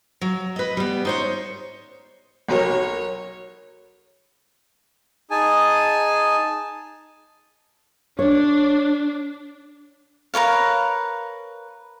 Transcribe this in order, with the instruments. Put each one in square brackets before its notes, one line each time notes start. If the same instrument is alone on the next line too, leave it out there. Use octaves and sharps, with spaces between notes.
[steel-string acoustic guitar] F#3
B4 D#5
G3 B3
D#4 C5 C#5
[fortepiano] B1 F#3 A#4 [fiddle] C#5
[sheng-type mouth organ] D#4 G#4 G#5 A5
[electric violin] D4 [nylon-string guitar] C#5
[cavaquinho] A#4 B4 C#5 F5